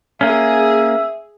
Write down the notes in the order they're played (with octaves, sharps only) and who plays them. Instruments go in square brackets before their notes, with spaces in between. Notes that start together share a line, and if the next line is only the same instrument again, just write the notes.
[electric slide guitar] A#3 C#4 [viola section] G#4 [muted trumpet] E5